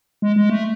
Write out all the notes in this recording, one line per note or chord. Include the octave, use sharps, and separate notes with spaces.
G#3
G#3
A3